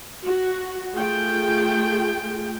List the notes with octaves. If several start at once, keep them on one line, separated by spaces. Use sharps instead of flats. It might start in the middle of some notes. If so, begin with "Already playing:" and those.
F#4
A3 F4 G#4 G5